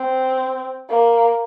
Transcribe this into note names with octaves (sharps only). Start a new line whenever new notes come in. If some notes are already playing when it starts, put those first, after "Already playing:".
Already playing: C4
A#3